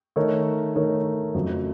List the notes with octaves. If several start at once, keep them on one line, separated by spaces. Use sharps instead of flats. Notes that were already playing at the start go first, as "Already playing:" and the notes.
D#3 A3 D#4 A#4 C#5
D#3 A3 D#4 A#4 C#5
F2 C#3 F#3 A3 C4